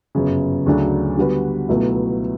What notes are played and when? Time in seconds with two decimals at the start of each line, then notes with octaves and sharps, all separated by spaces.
0.15 G1 F#2 C#3
0.66 D2 C#3 F#3 A3 D4
1.17 D3 G3 B3 F#4 B4
1.69 C#2 B2 F#3 A3 E4